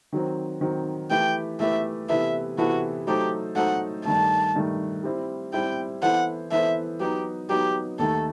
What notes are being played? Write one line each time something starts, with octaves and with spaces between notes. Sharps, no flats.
D#3 F#3 C4
D#3 F#3 C4
E3 A3 E4 G4 B4 G5
E3 A3 E4 G4 B4 E5
C3 E3 B3 E4 A4 E5
C3 E3 B3 E4 F#4 A4
F#3 A3 D#4 G4 A4 C5
F#3 A3 D#4 A4 C5 F#5
G2 D#3 A3 A5
G2 D#3 A3
G3 C4 E4
G3 C4 E4 G5
E3 B3 E4 A4 C5 F#5
E3 B3 E4 A4 C5 E5
F#3 B3 D#4 G4
F#3 B3 D#4 G4
D#2 D#3 A3 A4